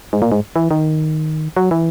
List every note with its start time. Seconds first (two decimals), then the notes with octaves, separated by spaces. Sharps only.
0.13 G#2
0.22 A#2
0.32 G#2
0.56 E3
0.71 D#3
1.56 F#3
1.71 E3